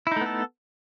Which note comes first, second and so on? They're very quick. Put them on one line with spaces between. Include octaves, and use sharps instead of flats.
E4 D#4 A3 B3 A4